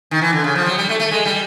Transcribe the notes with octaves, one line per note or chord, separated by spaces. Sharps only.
D#3
E3
D3
C#3
F3
F#3
G3
A3
A3
G#3
G3